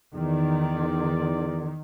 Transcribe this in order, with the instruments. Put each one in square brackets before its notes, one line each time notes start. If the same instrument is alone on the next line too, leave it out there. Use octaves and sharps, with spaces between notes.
[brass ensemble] E2 D5 [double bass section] D#3